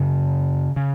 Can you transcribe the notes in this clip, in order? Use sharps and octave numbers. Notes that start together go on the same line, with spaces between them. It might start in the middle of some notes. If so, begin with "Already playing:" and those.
Already playing: F#2 C#3
C#3